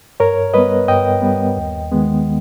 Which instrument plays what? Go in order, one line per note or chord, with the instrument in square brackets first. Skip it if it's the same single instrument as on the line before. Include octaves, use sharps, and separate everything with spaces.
[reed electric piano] G2 A#4 C#5
G3 B3 B4 D#5
G2 D#5 G5
G3 B3
D#2
D#3 G#3 B3